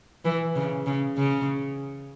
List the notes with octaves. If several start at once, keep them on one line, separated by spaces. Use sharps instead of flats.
E3
C#3
C#3
C#3